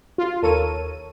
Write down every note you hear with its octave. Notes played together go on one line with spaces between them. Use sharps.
F4
D#2 A4 A#4 C#5 D#7